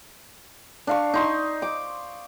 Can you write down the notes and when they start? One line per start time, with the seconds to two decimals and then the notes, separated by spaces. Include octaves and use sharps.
0.87 D4 F5 C#6
1.14 D#4 C6 C#6
1.62 D6